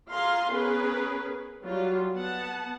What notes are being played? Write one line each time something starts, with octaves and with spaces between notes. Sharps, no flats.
F4 G#4 F5 A#5 C6
B3 C#4 G#4 A#4 B4
F#3 G3 F4
B3 F#5 A5